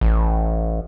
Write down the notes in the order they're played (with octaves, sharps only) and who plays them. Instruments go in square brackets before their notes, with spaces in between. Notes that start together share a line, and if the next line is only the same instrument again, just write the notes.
[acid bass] A1